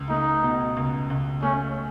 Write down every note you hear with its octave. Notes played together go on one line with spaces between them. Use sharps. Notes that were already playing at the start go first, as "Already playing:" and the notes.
Already playing: C#2
A3 D#4
B2
C#2
C#2
A3 C#4